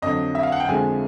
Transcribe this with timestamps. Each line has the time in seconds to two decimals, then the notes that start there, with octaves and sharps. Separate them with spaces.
0.02 F2 D3 F#3 D#5
0.35 E5
0.43 F5
0.52 F#5
0.60 G5
0.68 F2 D3 F3 G#3 G#5